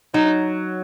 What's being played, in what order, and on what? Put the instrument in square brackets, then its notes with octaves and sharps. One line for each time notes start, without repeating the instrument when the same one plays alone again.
[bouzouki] F#3 [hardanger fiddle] D#4